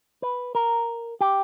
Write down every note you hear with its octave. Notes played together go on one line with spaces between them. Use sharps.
B4
A#4
G4